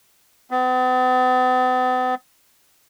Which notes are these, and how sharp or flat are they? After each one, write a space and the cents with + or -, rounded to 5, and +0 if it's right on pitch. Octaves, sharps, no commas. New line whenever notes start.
B3 +45